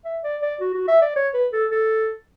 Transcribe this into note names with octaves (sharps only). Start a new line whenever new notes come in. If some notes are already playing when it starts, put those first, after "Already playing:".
E5
D5
D5
F#4
F#4
E5
D5
C#5
B4
A4
A4